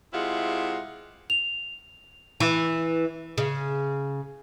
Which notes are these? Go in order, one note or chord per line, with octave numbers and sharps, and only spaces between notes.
C3 G#3 E4 F4 F#5
F7
E3
C#3